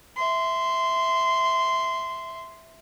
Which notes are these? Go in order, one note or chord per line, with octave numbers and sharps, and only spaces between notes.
E5 C6